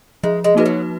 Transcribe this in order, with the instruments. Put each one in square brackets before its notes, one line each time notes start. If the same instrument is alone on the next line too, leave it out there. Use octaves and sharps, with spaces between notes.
[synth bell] F3 [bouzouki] G#3
[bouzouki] G#3
[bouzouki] G#3 [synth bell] A#3 D#4 F#4 B4
[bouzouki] F#3